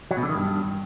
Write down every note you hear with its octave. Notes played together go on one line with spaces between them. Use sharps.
F#3
B2
D3
D#3
G2